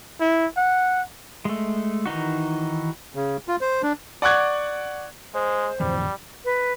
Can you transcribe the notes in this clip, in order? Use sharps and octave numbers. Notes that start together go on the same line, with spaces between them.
E4
F#5
G#3 A3
D#3 E3 D#4 F#4
C#3
F4
C5
D4
D5 F#5 C#6 D6 F#6 G#6
G#3 C5
D1 F2 E3 G3
B4